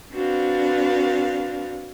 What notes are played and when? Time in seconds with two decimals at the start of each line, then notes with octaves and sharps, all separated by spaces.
0.13 C4 D4 F#4 B4 F5